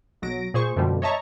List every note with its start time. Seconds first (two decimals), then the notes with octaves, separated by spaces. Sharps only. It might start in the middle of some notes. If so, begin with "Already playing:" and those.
0.22 B1 F#3 A#6 D7
0.54 A#2 G#4 C5 C#6
0.76 F#2 B2 D3 F3 G3
1.02 C#5 D#5 E5 A5 A#5 C#6